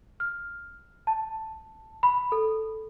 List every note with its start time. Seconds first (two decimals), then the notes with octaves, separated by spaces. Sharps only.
0.20 F6
1.07 A5
2.03 B5
2.32 A4